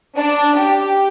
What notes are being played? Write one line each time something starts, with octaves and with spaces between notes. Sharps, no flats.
D4
G4